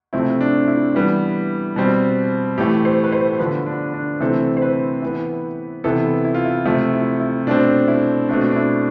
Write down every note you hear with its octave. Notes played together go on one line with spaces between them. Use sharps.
C3 F3 A3 C4 E4
D4
E4
E3 G3 B3
B2 G3 C4
A2 E3 A3 G4
C5
B4
C5
D3 F3 B3 B4
D4
D4
C3 E3 A3 C4 A4
C5
B4
E3 B3
C3 E3 B3 A4
E4
F4
E4
C3 F3 A3
E4
E4
B2 A3 C4 D4
E4
B2 A3 C4 D4
D4
E4